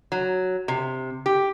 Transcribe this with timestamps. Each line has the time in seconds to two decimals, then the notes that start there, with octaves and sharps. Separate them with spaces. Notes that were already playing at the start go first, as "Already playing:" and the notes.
0.12 F#3
0.68 C3
1.26 G4